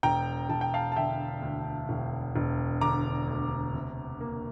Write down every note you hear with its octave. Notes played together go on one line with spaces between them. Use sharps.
E1 G5 A#5
E1 A5
G5
F5 A5
A5
D3 E5 G5
D2
E1
E1
D3 A#5 D6
D2
C3
A#3